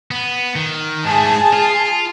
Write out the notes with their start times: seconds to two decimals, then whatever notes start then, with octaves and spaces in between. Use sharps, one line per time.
0.11 B3
0.56 D#3
1.05 G#2 A3 G#4 A5
1.53 F4